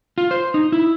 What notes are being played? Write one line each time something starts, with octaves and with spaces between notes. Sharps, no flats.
F4
C5
D#4
E4